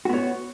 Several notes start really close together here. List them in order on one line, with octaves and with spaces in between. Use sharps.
F#4 B3 C#5